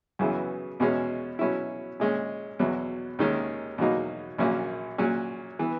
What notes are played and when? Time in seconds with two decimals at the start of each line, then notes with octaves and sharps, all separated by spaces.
0.19 F#2 C#3 E3 B3
0.80 E2 B2 G#3 C#4
1.39 B2 F#3 C#4 E4
2.00 A#2 G#3 C#4
2.59 E2 B2 F#3
3.19 D#2 D#3 G#3 C#4
3.78 E2 B2 F#3 A#3 D#4
4.38 A#1 A#2 F#3 A#3 C#4
4.98 A#2 F#3 C#4 F#4
5.59 E3 B3